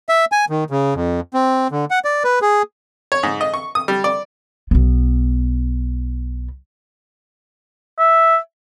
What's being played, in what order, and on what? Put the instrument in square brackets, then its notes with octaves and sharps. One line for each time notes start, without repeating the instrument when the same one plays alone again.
[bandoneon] E5
G#5
D#3
C#3
F2
C4
D3
F#5
D5
B4
G#4
[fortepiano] C#5
G#2
D#5
C#6
D#6
G3
D5
[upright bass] B1 B3
[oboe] E5